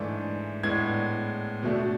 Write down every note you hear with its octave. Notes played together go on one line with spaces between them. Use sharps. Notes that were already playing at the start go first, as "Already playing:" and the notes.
Already playing: G#2 E3 A3 D4
A2 G#3 B3 D4 G#6
B2 A3 D4